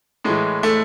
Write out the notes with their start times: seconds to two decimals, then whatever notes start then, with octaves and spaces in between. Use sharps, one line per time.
0.25 A2 E3 G#3
0.63 A3